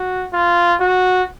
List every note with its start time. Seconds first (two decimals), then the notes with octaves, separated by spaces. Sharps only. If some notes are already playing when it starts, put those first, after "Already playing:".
Already playing: F#4
0.33 F4
0.81 F#4